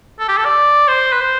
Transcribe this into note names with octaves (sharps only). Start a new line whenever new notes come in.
A4
G4
A4
D5
C5
B4
C5